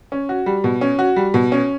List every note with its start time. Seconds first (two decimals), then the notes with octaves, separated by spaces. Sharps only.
0.12 C#4
0.29 F#4
0.46 G3
0.64 B2
0.81 C#4
0.99 F#4
1.16 G3
1.34 B2
1.52 C#4